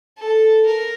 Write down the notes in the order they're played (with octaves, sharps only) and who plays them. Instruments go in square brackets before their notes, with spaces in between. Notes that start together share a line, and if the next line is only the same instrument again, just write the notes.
[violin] A4
A#4